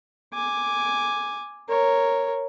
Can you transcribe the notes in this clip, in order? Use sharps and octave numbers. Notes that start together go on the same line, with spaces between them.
G#5 D6
A#4 C#5